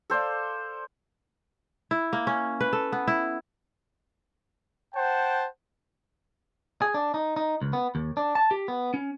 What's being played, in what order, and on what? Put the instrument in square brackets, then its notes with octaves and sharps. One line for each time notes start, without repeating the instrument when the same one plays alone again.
[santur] A4 C5 D5 F5
[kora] E4
A#3
C#4
B4
A4
B3
E4
[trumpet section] C5 F#5 G5 A5
[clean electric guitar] G#4
D4
D#4
D#4
C#2
B3
D#2
D4
A5
G4
B3
C#4